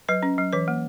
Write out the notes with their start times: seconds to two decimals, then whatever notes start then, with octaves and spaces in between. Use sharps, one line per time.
0.09 F#3 B4
0.23 C#4
0.38 F#3
0.53 E3 B4
0.68 A#3